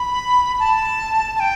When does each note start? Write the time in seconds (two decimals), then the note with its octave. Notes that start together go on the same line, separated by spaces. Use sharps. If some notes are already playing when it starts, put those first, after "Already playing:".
Already playing: B5
0.60 A5
1.36 A5
1.40 G5